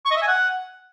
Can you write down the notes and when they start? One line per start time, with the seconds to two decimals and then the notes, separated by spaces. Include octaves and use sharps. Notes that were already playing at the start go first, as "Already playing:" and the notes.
0.05 C#6
0.11 D#5
0.16 E5
0.22 G#5
0.28 F#5